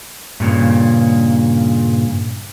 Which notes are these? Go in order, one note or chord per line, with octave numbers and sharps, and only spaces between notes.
G2 A#2 C#3